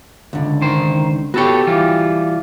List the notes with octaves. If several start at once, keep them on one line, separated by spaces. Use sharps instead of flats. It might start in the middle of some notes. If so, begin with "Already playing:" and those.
C#2 D3
D#3 C5
B3 F#4 G4 A4 C#5
E3 G3 F4